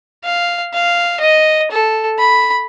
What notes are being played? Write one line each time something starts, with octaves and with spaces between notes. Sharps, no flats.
F5
F5
D#5
A4
B5